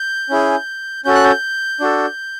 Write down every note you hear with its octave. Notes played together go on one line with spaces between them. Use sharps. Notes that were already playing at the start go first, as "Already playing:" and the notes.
Already playing: G6
C#4 E4 G#4
C#4 F#4 A4 G6
F#6
G6
D4 F#4 A4